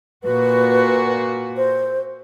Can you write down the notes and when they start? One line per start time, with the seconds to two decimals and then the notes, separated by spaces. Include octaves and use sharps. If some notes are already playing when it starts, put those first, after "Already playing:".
0.24 A#2 F#4 B4
1.57 C5